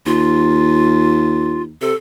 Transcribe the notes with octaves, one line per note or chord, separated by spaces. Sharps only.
D#2 F4
C3 A4